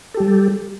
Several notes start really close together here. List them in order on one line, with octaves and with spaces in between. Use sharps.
A4 G4 G3